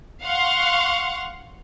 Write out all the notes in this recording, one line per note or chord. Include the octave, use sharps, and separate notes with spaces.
F5 F#5 C6 C#6